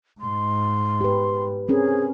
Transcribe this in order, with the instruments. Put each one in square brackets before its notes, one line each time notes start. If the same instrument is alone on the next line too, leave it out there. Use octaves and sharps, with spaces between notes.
[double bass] G#2 [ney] C6
[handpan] G4 B4
[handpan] C4 C#4 A#4 [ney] G#4